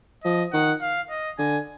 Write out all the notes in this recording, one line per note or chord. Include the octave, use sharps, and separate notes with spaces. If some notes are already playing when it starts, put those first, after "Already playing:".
F3 D#5
D#3 F#5
F5
D#5
D3 G#5